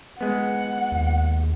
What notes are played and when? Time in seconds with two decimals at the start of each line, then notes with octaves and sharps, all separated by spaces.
0.21 G#3 B3 F#5
0.92 D#2